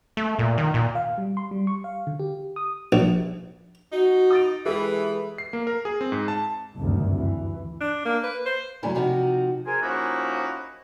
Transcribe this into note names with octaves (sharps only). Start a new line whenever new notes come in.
A3
A#2
D#3
A#2
F5
G3
C6
G3
C#6
F5
D3
G4
D#6
A#1
D#4 F#4
D#6 A6 D7
E3 G#3 G4 A4 B4
C7
A#3
A#4
G#4
C4
G#2
A5
F#1 D2 G2 C3 D#3
E3
D4
A#3
B4
C5
G2 C#3 E3 F#3 A3 E4
C3 F3 D#4 F#4
G#4 A#4 C5 G#5
F3 A#3 C#4 D#4 E4 F#4